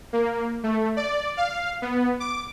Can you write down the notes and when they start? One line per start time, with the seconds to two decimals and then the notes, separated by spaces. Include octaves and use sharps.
0.13 A#3
0.63 A3
0.97 D5
1.37 F5
1.82 B3
2.20 D6